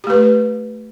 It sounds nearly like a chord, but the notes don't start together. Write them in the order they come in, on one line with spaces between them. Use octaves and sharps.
G4 A3 B4